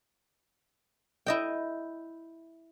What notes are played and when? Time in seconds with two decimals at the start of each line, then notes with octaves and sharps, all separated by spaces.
1.26 E4 D#5 G5